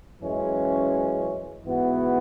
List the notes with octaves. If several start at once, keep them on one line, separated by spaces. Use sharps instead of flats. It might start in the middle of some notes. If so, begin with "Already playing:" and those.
F#2 E3 G#3 C#4
G#2 E3 B3 F#4